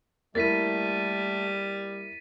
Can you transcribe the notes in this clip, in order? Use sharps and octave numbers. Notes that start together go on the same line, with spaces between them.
G3 A3 A#3 E4 A6 B6 D#7